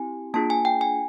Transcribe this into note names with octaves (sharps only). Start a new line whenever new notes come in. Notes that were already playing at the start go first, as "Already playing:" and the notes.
Already playing: C4 E4 G4 G#5
A#3 D4 F4 G#4 A5
G#5
G5
G#5